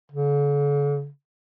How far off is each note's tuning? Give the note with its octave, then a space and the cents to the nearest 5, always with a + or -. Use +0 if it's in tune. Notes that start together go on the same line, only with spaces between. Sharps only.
D3 -45